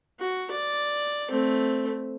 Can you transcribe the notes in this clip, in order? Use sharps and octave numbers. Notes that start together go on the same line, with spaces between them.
F#4
D5
A3 C4